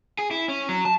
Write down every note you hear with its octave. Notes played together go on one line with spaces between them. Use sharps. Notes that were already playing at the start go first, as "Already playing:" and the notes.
G#4
E4
C#4
F#3
A5